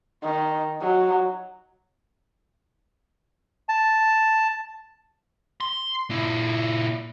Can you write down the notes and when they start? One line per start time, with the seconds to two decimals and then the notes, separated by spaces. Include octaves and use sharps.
0.24 D#3
0.81 F#3
3.69 A5
5.61 C6
6.10 A#2 E4